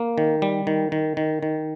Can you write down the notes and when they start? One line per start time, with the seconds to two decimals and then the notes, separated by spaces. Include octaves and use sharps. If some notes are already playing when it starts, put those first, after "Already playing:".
Already playing: A#3
0.18 D#3
0.42 G3
0.67 D#3
0.92 D#3
1.17 D#3
1.43 D#3